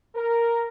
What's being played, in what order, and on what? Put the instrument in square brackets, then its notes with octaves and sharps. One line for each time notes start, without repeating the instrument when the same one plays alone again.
[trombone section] A#4